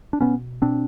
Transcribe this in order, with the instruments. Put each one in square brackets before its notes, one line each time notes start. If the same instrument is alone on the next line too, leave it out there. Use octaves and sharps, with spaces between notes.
[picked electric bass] D4
B2 B3 C#4
B2 C4 D4